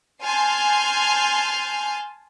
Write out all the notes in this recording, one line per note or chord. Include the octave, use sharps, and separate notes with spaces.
G#5 A5 C6 F6 G6